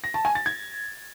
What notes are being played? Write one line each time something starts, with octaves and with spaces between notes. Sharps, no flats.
A#6
A5
G#5
A6
G#6